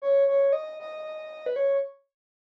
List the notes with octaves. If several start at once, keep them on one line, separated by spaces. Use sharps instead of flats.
C#5
C#5
D#5
D#5
B4
C#5